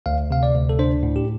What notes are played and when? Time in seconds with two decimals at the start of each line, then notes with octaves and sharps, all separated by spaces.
0.06 D2 F5
0.31 C3 F5
0.43 D5
0.54 D2
0.69 A4
0.79 D4 C5
1.03 A2
1.16 G4